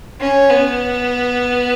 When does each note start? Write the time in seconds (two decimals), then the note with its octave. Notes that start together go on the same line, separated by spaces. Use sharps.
0.20 C#4
0.50 B3